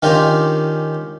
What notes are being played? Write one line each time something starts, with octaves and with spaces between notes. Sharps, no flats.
D#3 C#4 D4 F4 G4 D5